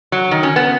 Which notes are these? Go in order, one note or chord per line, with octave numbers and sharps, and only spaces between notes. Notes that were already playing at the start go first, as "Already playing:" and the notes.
F#3
D#3
C#4
B3